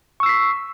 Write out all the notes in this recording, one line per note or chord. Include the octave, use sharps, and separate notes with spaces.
C#6 E6 B6 C7